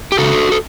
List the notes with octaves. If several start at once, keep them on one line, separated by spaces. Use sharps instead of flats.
G4
C#3 F#4 A4
A4